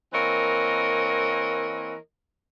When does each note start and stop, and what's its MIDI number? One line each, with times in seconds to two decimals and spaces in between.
0.13 1.95 52
0.13 1.95 58
0.13 1.95 60
0.13 1.95 70
0.13 1.95 73
0.13 1.95 75